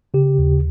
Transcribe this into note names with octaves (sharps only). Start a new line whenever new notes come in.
C#3 G4
D#2